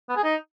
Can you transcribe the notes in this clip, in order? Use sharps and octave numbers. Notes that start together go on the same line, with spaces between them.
B3
G#4
D#4